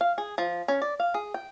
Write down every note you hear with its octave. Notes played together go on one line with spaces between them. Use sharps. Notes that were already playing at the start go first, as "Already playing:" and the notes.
F5
G#4
F3
C#4
D5
F5
G#4
G5